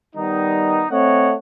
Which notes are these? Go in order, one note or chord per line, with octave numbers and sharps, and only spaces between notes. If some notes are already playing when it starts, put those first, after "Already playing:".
D#3 G3 B3 D#4
A3 C4 C#5 D#5 F#5